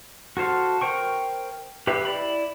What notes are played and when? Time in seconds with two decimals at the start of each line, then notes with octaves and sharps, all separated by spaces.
0.37 F#4 A4 C5 F5
0.81 A#4 C5 G5 C#6
1.87 G4 B4 E5 F5
2.05 E4 D5 B5